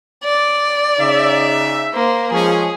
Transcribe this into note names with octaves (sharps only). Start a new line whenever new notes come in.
D5
C#3 D#4 E5
A#3 C5
F3 G#3 C#4 G#4